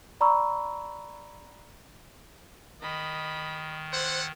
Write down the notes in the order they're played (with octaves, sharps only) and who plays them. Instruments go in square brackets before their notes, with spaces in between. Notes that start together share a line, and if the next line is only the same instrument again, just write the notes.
[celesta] D5 A#5 B5 C#6 E6
[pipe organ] D#3 [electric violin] D#5 B5
[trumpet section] E4 A4 F#5 [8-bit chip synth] C5 F#6